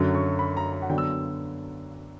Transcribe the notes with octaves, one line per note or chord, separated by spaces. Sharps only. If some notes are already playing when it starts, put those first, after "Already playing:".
Already playing: F#2 D3 F#3 C#4
C#6
B5
A#5
A#5
F#5
D3 F#3 B3 D4 G5
E6